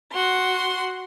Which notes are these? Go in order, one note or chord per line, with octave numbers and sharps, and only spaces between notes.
F#4 C6